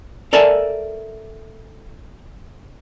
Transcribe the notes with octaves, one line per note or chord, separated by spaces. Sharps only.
A4 A#4 D5 E5 G#5 A5